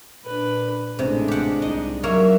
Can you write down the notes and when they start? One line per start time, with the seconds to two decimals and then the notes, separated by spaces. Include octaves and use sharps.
0.25 A#2 D4 B4
0.99 A1 C3 G#3 A3 D4
1.28 G4 F#5
1.62 C2 D#4 D#5
2.03 F#3 A#3 A#4 C#5 E5